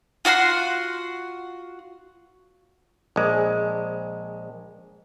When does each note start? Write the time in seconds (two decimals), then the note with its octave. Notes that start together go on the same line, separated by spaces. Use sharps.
0.25 F4 F#4 F#5 C6
3.16 A#1 G#3